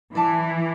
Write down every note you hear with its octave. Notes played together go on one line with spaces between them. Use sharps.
E3 D5 A5 D6